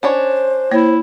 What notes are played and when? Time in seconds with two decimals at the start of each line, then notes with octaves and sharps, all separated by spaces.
0.03 C#4 D4 C5 C#5
0.71 A#3 E4 C#5